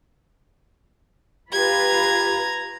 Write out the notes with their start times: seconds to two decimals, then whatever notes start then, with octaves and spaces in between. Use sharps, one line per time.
1.53 F4 G4 B4 A#5 G#6